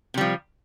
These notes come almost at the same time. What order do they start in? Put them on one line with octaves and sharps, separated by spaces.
C3 G3 F3